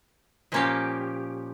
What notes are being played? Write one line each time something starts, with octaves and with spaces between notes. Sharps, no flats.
A#2 F3 A#3 C#4 G4